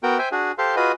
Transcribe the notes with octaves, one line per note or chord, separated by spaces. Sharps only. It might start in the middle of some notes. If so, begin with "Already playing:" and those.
B3 F#4 A#4 G5
C5 E5 G5 G#5
D4 F#4 G#4
G4 A4 C5 F5 C6
F4 F#4 G#4 B4 D#5